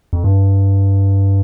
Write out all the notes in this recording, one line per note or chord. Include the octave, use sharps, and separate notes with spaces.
F2
G2